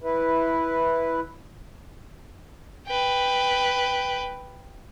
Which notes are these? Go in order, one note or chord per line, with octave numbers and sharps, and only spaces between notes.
E4 B4
B4 G5